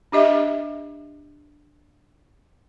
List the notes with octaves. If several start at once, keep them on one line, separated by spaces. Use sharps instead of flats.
D4 G4 D#5 E5